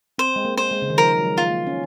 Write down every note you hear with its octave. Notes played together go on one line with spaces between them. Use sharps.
C4 C5
G#3
A#3
C5
G#3
C#3
D#3
F3 A#4
F#3
G#3
F4
A#3
C#4